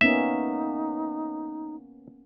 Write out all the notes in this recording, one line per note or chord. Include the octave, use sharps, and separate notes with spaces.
A#3 B3 C#4 D#4 E5